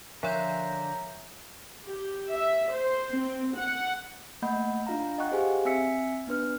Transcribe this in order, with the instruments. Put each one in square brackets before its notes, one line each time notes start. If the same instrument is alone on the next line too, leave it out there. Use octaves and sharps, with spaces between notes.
[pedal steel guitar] D3 F5 C6 [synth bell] F3 C#5 G6 [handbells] E5 [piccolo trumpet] A#5
[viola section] G4
E5
C5
C4
F#5
[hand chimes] A3 A#3 D#5 F#5 B5 G6
D4 F4 F5 A#5
D#5 F#5 G5 C#6 F#6
G4 G#4 C5 F5 G#5
C4 E5 G#5 E6 B6 C#7
B3 D4 B4 F6